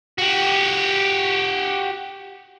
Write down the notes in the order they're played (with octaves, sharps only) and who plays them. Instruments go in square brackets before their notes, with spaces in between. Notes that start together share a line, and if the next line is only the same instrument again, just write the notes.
[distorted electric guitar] F#4 G4